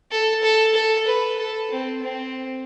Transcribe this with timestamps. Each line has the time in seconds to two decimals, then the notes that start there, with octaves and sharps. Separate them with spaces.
0.11 A4
0.43 A4
0.75 A4
1.07 B4
1.39 A4
1.71 C4
2.03 C4